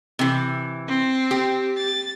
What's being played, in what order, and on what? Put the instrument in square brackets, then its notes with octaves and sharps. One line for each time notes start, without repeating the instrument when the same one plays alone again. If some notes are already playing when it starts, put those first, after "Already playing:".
[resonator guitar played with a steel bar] C3 E3
[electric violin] C4
[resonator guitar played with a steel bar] G4
[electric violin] A6